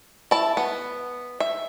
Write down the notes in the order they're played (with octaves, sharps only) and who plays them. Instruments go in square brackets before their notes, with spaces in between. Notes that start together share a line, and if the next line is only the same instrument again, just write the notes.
[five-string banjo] E4 A5
B3
E5